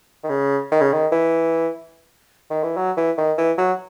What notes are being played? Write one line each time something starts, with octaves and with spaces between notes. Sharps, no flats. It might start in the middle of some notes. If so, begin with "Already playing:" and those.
D#3
C#3
D#3
C#3
D#3
E3
D#3
E3
F#3
E3
D#3
E3
F#3